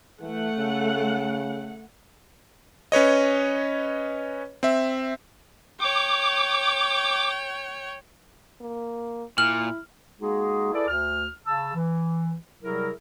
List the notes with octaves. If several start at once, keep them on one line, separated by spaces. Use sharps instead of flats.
E3 A3 F#5
C#3
C#4 B4 C#5 D#5
C4 E5
C#5 G5 D6
A#3
A#2 E4 F6 F#7
G#3 A#3 D#4 F#4 G#4
E4 G#4 A4 B4 D5
D2 F6
C#3 A5 E6
E3
C3 F#3 G3 E4 G#4 A#4